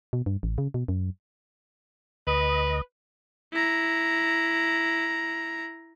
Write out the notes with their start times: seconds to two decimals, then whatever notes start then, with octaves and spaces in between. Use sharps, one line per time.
0.13 B2
0.26 G2
0.43 A1
0.58 C#3
0.74 B2
0.88 F#2
2.27 D2 B4 D#5
3.53 E4 A#5